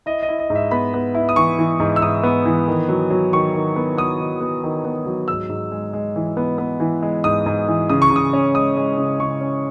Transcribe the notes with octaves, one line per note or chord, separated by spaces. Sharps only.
E4 D#5
D#5
E4
D#5
G#2
E5
B3 B5
B3
E4
D#6
E3 C#6
E3
G#2
E6
G#2 D#6
B3
E3
D#3
F#3
F#3
D#3 C#6
D#3
B3
B3 D#6
D#3
B3
D#3
B3
F#3
G#2 E6
G#2
G#3
G#3
E3
B3
B3
E3
G#3
G#2 D#6
G#2
E3
C#3 D#6
C#6
C#3
D#6
C#4
G#3 D#6
G#3
C#3
C#3 C#6
C#4